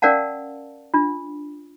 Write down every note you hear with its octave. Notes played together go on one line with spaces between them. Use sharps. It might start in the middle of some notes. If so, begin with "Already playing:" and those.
C#4 A#4 D5 F5 F#5 A5
D4 F4